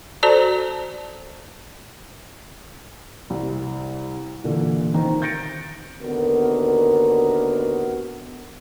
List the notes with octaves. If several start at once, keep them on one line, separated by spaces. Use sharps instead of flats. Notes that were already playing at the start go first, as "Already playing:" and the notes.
F#4 A4 C5 D5 A5 A#5
C2
A#2 D3 E3
D#3 C4 D#4
G6 A6 A#6 C#7 D7
D#2 D3 B3 F#4 A#4